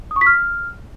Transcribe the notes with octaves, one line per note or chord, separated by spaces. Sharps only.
D#6
C#6
B6
F6